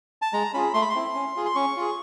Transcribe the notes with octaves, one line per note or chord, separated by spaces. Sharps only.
A5
G#3 A#5
C#4 F4 G#4 B5
A3 C6
B5
C6
C4 E4
C#4
F4 G#4
C6
C#4 C#6
F4 G#4